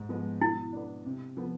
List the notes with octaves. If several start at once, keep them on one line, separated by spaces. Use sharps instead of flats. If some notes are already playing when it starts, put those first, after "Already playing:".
Already playing: G#2
F3 G#3 B3
B2 E4
B3 D4
C3
F3 B3